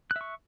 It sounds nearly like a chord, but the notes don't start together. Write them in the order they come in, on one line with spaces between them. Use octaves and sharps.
F#6 E5 C#6